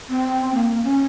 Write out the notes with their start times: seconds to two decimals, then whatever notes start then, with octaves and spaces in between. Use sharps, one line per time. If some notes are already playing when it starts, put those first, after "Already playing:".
0.09 C4
0.54 A#3
0.69 A#3
0.84 C#4